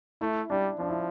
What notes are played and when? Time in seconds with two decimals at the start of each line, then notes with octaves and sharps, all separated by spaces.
0.21 A3 E4
0.50 G3 D4
0.79 F3 D4
0.89 E4